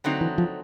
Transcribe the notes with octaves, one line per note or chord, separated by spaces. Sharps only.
D3 F#3 A3 C4 D#4
E3
F3